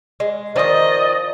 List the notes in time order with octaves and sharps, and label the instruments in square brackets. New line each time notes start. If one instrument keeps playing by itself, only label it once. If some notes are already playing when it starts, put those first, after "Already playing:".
[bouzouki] G#3
[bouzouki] D#3 F3 [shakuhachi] D5 [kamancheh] D#5